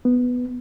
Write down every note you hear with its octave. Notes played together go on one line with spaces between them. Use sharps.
B3